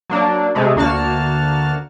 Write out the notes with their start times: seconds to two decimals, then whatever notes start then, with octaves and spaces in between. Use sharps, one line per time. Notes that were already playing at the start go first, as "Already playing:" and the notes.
0.10 F#3 A#3 D4
0.55 C3 G#3 A3
0.76 D2 A#3 F#4 A5 F6